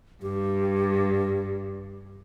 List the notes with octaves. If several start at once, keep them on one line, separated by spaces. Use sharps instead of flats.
G2 G4